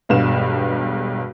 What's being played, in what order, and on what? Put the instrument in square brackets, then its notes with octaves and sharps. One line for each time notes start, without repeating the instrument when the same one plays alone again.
[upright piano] E1 B1 G2 B4 F5 E7